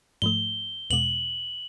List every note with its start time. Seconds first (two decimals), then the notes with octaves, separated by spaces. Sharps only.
0.22 G#2 F3 A3 G7
0.90 E2 B2 G#3 F#7